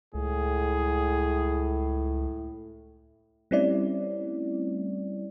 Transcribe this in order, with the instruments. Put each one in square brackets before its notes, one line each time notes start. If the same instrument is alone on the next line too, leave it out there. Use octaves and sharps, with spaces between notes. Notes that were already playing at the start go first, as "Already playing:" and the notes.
[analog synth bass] C#2 [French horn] A2 [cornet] G#4
[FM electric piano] G3 A3 C4 C#4 E4 D5